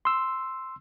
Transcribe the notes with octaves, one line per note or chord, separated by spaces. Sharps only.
C6 E6